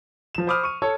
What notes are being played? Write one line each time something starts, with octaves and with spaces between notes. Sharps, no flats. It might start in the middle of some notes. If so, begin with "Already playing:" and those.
F3 E7
C5 B5 D6 D#6 F6
C#6 D#7
A4 C#5